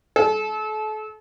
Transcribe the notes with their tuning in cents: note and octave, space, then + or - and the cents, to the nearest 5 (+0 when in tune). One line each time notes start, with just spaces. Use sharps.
A4 -35